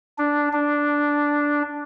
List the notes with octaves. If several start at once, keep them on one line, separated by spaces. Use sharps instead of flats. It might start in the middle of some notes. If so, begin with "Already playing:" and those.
D4
D4